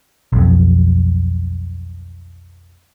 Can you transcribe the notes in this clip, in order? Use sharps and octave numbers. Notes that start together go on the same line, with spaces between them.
B1 F2